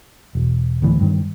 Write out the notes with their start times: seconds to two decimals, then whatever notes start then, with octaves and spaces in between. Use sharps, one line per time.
0.35 E1
0.82 D2 A2 E3
1.00 G2 D#3